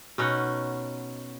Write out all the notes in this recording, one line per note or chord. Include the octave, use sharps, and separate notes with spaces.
B2 C#4 D#4 F#5